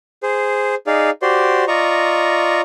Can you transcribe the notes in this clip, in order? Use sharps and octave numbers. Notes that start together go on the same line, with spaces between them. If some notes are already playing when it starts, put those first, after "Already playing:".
G#4 C5
D#4 G#4 D5 F5
F#4 G4 C5 D5 C6
F4 D5 D#5 A#5 C#6